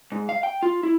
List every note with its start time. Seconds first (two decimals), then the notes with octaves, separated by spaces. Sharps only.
0.12 G#2
0.29 F5
0.43 G5
0.63 F4
0.83 E4